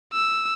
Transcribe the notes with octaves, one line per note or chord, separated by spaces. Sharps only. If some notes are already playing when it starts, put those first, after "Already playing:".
E6